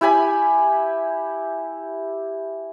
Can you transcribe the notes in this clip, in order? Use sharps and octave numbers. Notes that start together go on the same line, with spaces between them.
E4 G4 G#5 B5